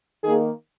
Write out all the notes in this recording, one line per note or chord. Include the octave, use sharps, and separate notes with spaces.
D#3 A#3 G#4